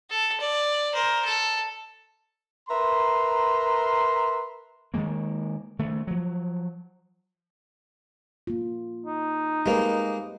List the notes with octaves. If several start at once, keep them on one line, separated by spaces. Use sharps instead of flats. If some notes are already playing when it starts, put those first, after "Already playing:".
A4
D5
A#4 C5
A4
A#4 B4 E5 A#5 C6
D#3 E3 G#3 A#3
D#3 A3
F3 F#3
A#3 F4
D#4
G#3 A#3 G4 B4 C5